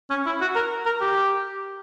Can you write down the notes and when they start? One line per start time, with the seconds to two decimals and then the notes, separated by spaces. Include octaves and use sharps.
0.10 C#4
0.26 E4
0.41 F#4
0.55 A#4
0.86 A#4
1.01 G4